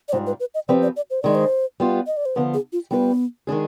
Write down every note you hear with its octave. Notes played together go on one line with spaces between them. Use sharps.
D5
G#2 G3 D4 F4 C5
B4
B4
D#5
F3 C4 G4 B4 D5
D5
D5
C5
D#3 G#3 D4 D5
C5
G3 B3 F4
D#5
D5
C5
D3 F3 B3 F4 B4
G#4
F4
G3 B3 D4 F4 G#4 B4
D#3 G#3 D4 G#4